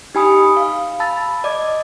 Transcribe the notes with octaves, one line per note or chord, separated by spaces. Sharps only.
D#4 G4 G#5 B5 D#6 C#7
F5
A5 B5 E6 A6
D5 D#5 D6 G#6